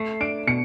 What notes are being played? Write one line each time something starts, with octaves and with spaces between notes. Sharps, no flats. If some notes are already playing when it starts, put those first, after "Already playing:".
Already playing: A3 C7
D4 D7
B2 C#7